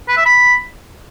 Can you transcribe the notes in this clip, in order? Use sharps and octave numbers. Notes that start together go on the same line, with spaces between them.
B4
E5
B5